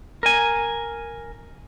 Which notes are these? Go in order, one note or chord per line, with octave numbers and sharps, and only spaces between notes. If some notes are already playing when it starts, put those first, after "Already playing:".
A#4 G#5